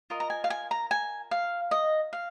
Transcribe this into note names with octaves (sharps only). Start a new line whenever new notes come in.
F4 A#4 D#5
A#5
G#5
F5
G#5
A#5
G#5
F5
D#5
F5